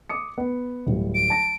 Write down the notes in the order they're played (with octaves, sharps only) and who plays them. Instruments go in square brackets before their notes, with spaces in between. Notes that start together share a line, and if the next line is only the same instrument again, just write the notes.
[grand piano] D6 D#6 C#7
B3
D1 G3
[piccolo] D7
[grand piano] A5 A#6